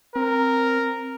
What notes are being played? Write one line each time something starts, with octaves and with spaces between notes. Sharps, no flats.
C4 A#4